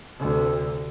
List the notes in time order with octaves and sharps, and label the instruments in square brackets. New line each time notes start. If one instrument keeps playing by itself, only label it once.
[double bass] D2 C3